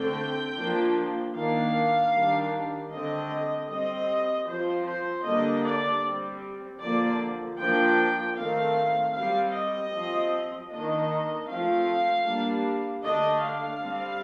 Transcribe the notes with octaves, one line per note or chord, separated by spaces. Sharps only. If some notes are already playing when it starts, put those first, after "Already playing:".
Already playing: D3 A3 C4 G5
F3 A#3 D4
D#3 A#3 D4 F5
D#3 G3 D4
D3 A3 C4 D#5
G3 C4 D#5
F3 C4 C5
C5
D3 G3 A#3 D4 D#5
D5
G3 C4
D3 F3 A#3 D5
F3 A#3 D4 G5
D#3 A3 C4 F5
G3 C4 F5
D#5
F3 C4
D#3 A#3 D4 D#5
F3 A3 C4 F5
G3 A#3 D4
D3 A3 D4 D#5
F5
G3 C4